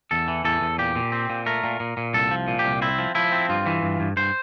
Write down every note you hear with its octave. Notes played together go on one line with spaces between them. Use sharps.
E2 A4
E3
E2 A4
E2
A#2 G4
A#2
C4
A#2
A3 A#4
A#2
A#2
A#2
C2 A4
F3
A#2
G4
C2
C4 E4
F3
F3 E4
C4
G2 F4
E3
G2
G2
G2 C5